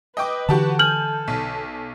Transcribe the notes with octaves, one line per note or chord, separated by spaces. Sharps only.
B4 D#5 G5 D6
D3 E3 F#4 G4 A5
A4 G#5 F6 G6 F#7
B1